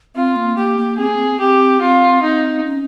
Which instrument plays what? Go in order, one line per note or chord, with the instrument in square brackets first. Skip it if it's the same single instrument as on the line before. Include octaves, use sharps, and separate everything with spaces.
[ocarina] C4 [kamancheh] F4
[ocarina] A#3
[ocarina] A#3 [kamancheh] G4
[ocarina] A#3
[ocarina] C4 [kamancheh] G#4
[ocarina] A#3
C4
[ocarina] C4 [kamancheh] G4
[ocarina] C4 [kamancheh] F4
[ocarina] C4 [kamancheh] D#4
[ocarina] C#4